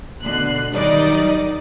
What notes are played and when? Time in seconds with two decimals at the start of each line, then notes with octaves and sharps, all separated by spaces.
0.24 B2 D3 F#6 C7
0.72 D#3 F#3 G3 D#4 D5 D#5